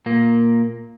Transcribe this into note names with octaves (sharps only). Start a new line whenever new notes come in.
A#2 A#3